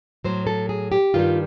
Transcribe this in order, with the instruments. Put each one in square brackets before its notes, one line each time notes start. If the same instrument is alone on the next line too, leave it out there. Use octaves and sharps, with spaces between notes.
[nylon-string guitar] A2 F#3 C5
A4
G#4
G4
G2 D#3 G3 F4